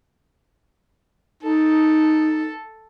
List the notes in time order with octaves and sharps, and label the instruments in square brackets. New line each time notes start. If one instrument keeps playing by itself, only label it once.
[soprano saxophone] D#4 [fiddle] A4